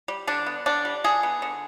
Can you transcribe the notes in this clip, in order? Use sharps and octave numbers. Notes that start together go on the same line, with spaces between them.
G3
D3 D4
B3
D3 D4
G3
D3 G#4
B3
D3